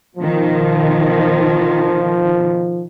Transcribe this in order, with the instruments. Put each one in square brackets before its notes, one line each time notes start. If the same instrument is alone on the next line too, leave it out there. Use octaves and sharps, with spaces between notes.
[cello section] B2 D#3 [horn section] F3